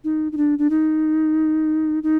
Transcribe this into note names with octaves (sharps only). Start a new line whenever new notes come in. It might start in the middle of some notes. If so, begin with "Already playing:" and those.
D#4
D#4
D4
D4
D#4
D#4